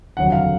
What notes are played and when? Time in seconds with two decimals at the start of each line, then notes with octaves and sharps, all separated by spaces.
0.17 F1 D#2 D3 F#3 F#5
0.32 F5